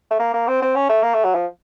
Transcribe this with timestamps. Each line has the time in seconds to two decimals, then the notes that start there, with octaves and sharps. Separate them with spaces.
0.11 A3
0.20 A#3
0.34 A#3
0.48 C4
0.62 C4
0.76 C#4
0.89 A3
1.03 A#3
1.14 A3
1.24 F#3
1.35 F3